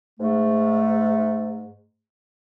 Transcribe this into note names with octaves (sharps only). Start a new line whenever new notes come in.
G#2 A3